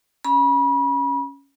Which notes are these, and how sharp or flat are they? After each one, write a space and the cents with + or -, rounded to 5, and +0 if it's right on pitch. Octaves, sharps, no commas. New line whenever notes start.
C#4 +0 B5 -35